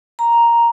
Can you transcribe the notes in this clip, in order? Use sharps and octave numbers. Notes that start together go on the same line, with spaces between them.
A#5